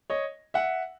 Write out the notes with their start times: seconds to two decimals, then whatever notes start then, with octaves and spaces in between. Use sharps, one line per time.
0.10 C#5 D#5
0.54 E5 F#5